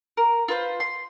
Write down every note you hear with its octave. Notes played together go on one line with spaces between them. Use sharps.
A#4
F4 B4 C5
C6